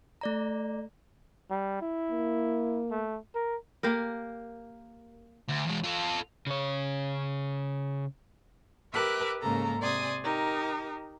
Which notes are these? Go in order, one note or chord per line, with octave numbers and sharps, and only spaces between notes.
A3 D5 A#5
G3
E4
A#3
A3
A#4
A#3 G4 A#4
D2
E2 G#3
F4 A4
C#3 C#5
G4 A#4 B4 E5 D6 F#6
G#2 C#3 A#3 A4 A#4 A#5
C3 D5 G#5 C6 D#6
D#4 G4 A#4